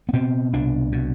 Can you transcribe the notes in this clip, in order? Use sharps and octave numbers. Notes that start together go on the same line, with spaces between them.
B3
B2 C4
C2 D4
B2